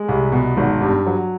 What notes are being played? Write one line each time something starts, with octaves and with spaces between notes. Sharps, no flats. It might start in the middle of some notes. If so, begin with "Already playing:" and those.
Already playing: G#3
C2
B2
G#1
G2
F#3